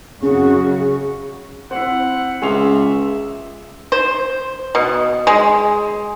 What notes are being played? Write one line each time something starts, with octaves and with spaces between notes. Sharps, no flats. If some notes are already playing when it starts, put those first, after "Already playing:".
F#2 C#3 C#4 F#4 G#4
C4 E4 F#5
C#2 G#4 E5 C6 F7
C5
B2
G#3